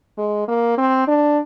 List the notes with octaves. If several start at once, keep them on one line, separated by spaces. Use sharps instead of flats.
G#3
A#3
C4
D4